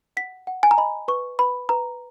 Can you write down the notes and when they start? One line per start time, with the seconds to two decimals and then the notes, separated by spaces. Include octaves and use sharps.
0.17 F#5 B6
0.47 F#5
0.63 G#5
0.71 A#5
0.78 D#5 B5
1.08 B4 C#6
1.39 B4 B5
1.69 B4 A#5